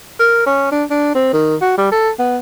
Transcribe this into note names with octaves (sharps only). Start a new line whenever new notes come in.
A#4
C#4
D4
D4
C4
D#3
F#4
G3
A4
B3